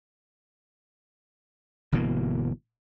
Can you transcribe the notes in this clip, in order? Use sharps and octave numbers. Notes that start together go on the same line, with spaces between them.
G1 B2 E3 A#3